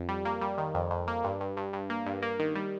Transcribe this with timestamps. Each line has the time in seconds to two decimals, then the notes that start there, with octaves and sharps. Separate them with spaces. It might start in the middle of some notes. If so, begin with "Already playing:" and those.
Already playing: F2
0.09 G3
0.25 A#3
0.41 G3
0.58 D#3
0.74 F2
0.91 F2
1.07 A#3
1.24 G2
1.40 G2
1.57 G2
1.73 G2
1.90 A#3
2.06 G2
2.22 A#3
2.40 D#3
2.55 G3